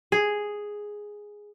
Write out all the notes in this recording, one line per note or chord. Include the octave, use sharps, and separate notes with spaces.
G#4